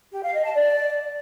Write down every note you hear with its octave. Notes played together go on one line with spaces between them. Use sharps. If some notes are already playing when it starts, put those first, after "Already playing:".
G4
F5
D#5
A5
D5